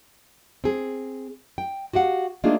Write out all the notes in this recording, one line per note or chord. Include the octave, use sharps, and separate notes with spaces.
C4 G#4
G5
F#4 G4 F5 F#5
A3 A#3 D4 D#4 F4 G#4